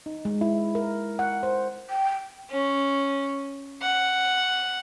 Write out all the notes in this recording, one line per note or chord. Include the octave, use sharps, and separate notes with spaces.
D#4
G#3
E4
A#4
F#5
C5
G5
C#4
F#5